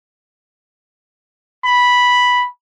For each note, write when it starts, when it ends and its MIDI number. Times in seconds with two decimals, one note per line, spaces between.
1.65 2.45 83